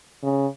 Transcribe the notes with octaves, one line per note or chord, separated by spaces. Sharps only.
C#3